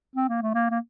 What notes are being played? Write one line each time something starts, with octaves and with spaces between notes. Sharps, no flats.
C4
A#3
A3
A#3
A#3